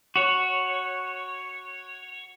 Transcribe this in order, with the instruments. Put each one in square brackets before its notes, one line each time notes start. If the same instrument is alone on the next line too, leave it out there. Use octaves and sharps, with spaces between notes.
[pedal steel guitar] F#4 C#5